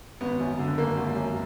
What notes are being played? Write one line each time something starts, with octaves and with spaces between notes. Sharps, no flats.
G#1 B3
F#2
D3
G#1 A#3
G#1
F#2